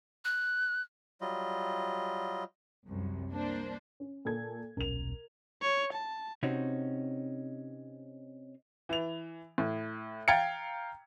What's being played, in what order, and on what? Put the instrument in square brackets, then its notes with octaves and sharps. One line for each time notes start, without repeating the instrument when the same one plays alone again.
[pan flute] F#6
[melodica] F#3 G3 F4 D#5
[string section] C2 F#2
A#3 D4 C5
[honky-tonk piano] C#4
A#2 A4 G#6
[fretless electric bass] D#1 B1 C#4 [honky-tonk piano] A#4 F7
[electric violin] C#5
A5
[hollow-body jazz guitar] C3 C4 C#4 D#4 F#4
[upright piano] E3 F7
A2
F5 G5 A#5 G#6 A6 C#7